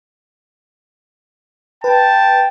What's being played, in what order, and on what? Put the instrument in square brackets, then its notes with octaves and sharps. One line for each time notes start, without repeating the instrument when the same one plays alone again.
[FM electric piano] B4 [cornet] G5 [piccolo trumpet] A5